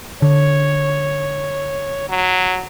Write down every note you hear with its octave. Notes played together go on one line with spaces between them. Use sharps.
D3 C#5
F#3